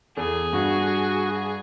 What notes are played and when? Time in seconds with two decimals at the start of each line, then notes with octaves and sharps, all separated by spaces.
0.17 E2 G#4 A4
0.53 G2 F#4